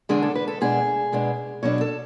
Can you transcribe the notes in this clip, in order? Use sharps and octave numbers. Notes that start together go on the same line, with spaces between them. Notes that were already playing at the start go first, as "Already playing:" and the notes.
E2 D3 G#3 D4 G#4
A4
B4
A4
B2 G#3 B3 D4 G#4
B2 G#3 B3 D4
B2 F#3 B3 D4 C#5
A4